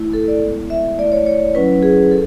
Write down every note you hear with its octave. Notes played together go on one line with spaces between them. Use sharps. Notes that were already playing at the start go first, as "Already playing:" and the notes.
Already playing: A3 E4
A4
D5
G#3 B3 E4
E5
A3 E4 D5
C#5
C#5
F#3 C#4 E4 B4
G#4
A4